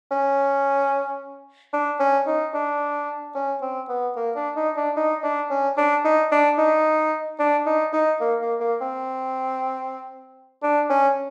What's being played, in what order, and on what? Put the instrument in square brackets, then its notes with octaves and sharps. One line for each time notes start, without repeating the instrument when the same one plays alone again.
[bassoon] C#4
D4
C#4
D#4
D4
C#4
C4
B3
A#3
D4
D#4
D4
D#4
D4
C#4
D4
D#4
D4
D#4
D4
D#4
D#4
A#3
A#3
A#3
C4
D4
C#4